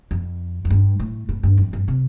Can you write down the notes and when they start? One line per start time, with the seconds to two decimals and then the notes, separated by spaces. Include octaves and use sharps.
0.11 F2
0.65 F2
0.70 G2
1.00 A2
1.29 A2
1.43 G2
1.57 F2
1.73 G2
1.88 C3